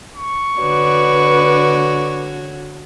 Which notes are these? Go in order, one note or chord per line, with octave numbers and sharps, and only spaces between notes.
C#6
D3 F#4 B4 C#5 D5